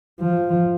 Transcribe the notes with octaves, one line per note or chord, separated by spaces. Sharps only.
F3